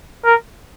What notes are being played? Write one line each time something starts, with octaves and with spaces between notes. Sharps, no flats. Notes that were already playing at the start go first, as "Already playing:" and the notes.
A#4